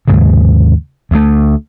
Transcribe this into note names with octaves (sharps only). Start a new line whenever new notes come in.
D#2 G#2 C#3
D2 A3